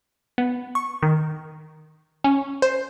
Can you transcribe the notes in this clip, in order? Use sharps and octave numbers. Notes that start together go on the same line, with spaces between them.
B3
C#6
D#3
C#4
C5